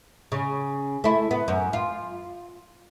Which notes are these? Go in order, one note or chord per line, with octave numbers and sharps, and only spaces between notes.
C#3
A3 E4
B3
F#2
F4